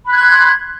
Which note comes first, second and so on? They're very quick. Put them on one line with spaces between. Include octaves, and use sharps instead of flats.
B5 F#6 G#6 C6